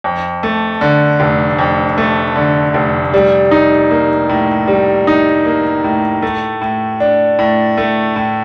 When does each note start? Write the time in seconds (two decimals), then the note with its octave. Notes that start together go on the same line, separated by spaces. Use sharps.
0.04 F2
0.43 A3
0.81 D3
1.20 F1
1.59 F2
1.98 A3
2.35 D3
2.74 F1
3.14 G3
3.51 D#4
3.90 A#3
4.29 A2
4.68 G3
5.07 D#4
5.45 A#3
5.84 A2
6.22 A3
6.61 A2
7.00 D4
7.39 A2
7.77 A3
8.16 A2